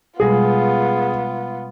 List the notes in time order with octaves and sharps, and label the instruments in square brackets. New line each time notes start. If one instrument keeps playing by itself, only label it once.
[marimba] B2 G3 G#3 [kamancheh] B3 F4 [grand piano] G#4